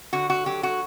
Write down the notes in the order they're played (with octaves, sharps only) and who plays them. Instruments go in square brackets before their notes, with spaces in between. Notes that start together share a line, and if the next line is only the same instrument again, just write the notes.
[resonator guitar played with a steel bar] D3 F#4
F#4
F#3 G4
F#4